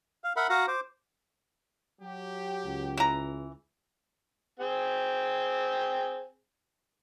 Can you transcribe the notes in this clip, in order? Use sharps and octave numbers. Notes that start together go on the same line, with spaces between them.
F5
A#4 E5 F#5 B5
F#4 F5 F#5 A#5
C5 D6
F#3 G4
C#2
E3 A#5
C4 G#4 G5